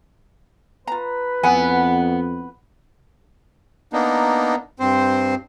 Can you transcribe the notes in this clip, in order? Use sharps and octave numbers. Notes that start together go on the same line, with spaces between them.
F4 B4 A#5
F2 B3 E4 F#5 G#5
A#3 B3 D4 D#4
G2 C4 C5